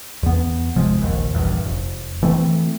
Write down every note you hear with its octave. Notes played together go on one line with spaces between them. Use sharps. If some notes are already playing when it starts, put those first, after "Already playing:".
E2 B3
G#1 C3 F3 G#3
F1 A#1 D#2
A#1 E2 G2
F1
E3 A3 C4